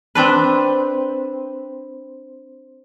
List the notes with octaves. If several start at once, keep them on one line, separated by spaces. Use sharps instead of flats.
C4 D4 B4